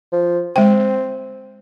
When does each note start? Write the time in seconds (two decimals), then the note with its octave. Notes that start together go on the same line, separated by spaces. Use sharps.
0.12 F3
0.56 G#3 C4 G5